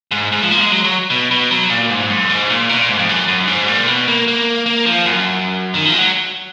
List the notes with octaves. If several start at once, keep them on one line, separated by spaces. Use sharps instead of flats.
G#2
G#2
F3
A#3
G#3
F#3
F#3
B2
B2
F#3
A#2
G#2
F#2
G#2
A#2
B2
A#2
G#2
F2
F#2
F#2
G#2
A#2
B2
A#3
A#3
A#3
F3
F#2
D#3
F3
G#3
F#3